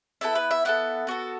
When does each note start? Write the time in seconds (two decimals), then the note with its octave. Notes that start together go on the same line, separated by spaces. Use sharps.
0.21 B3 E4 A4 E5
0.35 B4
0.51 E5
0.65 B3 E4 A4 F#5
1.07 B3 F#4 A4